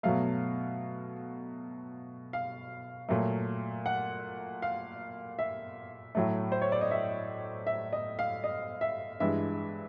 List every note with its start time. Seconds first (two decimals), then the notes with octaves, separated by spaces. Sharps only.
0.03 B2 F#3 A3 F5
2.33 F5
3.09 A#2 F#3 A3
3.86 F#5
4.62 F5
5.39 E5
6.15 A2 F#3 A3
6.52 C5
6.62 C#5
6.72 D5
6.81 D#5
6.91 E5
7.67 E5
7.93 D#5
8.19 F5
8.44 D#5
8.81 E5
9.20 G2 E3 G#3 E5